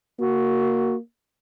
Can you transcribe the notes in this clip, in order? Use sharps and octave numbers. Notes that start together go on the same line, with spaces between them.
A#3 F#4